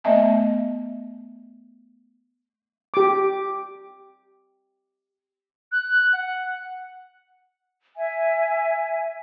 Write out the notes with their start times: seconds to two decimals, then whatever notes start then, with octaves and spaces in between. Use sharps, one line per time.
0.04 A3 B3 D#5 E5 G#5 A5
2.94 G4 D6
5.72 F#6
6.13 F#5
7.97 E5 G#5